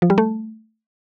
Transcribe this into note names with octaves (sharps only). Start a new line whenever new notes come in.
F3
G3
A3